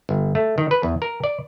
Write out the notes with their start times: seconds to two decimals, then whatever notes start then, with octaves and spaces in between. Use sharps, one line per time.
0.09 G1
0.35 A3
0.58 D#3
0.71 B4
0.83 E2
1.02 A#4
1.24 D5